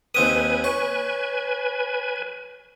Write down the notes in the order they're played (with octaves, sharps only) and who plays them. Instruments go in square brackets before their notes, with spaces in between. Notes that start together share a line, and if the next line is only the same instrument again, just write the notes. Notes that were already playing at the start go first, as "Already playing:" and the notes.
[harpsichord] D#2 C4 D#6 [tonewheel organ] B4 G#5
[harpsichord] C#5